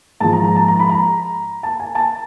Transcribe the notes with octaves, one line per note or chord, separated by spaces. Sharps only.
G#2 F3 A5
A#5
A#5
A5
A#5
B5
A#5
A5
G#5
A5